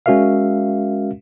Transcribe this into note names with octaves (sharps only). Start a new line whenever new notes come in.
G#3 C#4 F#4 A#4 E5 F5